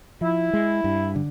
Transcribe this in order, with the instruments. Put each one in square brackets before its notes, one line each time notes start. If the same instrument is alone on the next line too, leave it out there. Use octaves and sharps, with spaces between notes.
[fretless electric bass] F3 [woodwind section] E4
[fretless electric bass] G#3
G2
D3